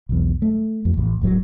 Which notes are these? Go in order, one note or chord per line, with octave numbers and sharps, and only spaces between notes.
B1 E2
A3
F2
A1
D1 G#2 F#3